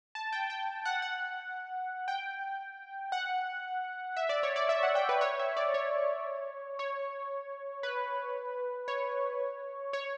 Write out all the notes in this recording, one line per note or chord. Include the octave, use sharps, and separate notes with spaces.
A5
G5
G5
F#5
F#5
G5
F#5
E5
D5
C#5
D5
E5
F#5
G5
B4
C#5
E5
D5
C#5
C#5
B4
C#5
C#5